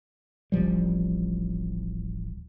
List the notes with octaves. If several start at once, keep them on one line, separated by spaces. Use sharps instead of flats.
D1 A1 F3 G3